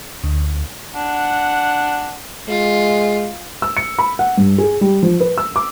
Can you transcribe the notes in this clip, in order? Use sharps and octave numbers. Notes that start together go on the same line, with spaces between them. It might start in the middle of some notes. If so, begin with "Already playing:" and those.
D2
D4 F#5
G#3 F4
E6
C#7
B5
F#5
G2
G#4
G3
F3
B4
E6
D6